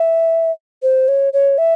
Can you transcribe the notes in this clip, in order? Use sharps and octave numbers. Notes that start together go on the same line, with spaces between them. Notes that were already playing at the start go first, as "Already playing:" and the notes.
Already playing: E5
C5
C#5
C#5
E5